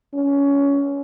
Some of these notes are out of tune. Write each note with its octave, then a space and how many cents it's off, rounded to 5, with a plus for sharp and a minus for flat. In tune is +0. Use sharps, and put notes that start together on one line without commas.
C#4 +20